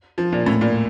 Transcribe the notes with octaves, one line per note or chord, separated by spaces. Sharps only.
F3
A#2
A2
A#2